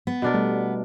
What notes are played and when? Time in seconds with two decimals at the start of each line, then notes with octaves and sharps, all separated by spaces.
0.07 B3
0.22 B2 D4 A#4
0.34 G3 A3